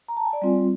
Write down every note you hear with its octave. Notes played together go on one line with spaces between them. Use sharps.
A#5
A5
G#5
D5
G3 C4 F4